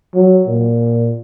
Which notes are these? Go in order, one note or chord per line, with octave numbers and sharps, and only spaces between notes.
F#3
A#2